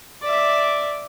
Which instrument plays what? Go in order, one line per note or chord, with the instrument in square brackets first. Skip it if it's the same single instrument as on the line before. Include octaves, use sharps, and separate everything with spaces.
[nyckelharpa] D5 E5